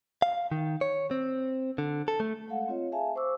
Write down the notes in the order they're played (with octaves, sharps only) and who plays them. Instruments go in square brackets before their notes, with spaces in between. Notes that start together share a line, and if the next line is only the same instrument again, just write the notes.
[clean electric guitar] F5
D#3
C#5
C4
D3
A4
A3
[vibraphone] G#3 A3 A4 F5 F#5
C4 F4 C#5 D#5
G#4 E5 F5 G#5 A5
C5 C#6 D6 E6